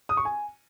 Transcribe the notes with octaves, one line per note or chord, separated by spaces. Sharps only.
D#6
C#6
G#5